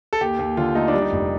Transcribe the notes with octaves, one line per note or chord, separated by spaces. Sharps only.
A4
D#2 G4
D#2
D3 F4
A3 D#4
D4
G3
D#4
F1